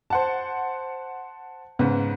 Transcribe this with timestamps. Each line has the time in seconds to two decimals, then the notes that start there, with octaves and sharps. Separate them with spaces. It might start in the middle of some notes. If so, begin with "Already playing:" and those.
0.10 C5 F#5 A5
1.79 G#2 C#3 B3